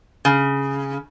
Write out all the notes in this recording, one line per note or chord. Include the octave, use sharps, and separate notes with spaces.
C#3